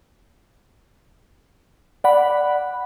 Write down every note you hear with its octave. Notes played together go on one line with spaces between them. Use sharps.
D5 F#5 B5